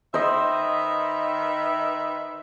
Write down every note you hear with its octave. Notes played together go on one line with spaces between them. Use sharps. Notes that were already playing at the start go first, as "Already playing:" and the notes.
D#3 B4 C5 D#5 E5